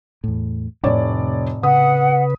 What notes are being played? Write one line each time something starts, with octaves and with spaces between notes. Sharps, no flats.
E2 A2
F1 A2 C3 C#5 D5
C#3 B4 F#5 D#6